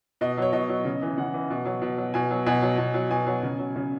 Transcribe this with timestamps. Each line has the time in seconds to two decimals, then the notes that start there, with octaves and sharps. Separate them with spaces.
0.21 B2 D#5
0.37 F#3 C#5
0.53 B2 D#5
0.69 F#3
0.85 C#3
1.02 E3
1.18 C#3 F#5
1.34 E3
1.50 B2
1.66 F#3
1.82 B2
1.98 F#3
2.14 B2 G#5
2.31 F#3
2.46 B2 G#5
2.62 F#3
2.78 B2
2.94 F#3
3.10 B2 G#5
3.27 F#3
3.43 C#3
3.59 F#3
3.76 C#3